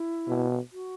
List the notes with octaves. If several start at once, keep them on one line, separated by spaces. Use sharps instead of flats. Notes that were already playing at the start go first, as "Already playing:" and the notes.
Already playing: E4
B2
F#4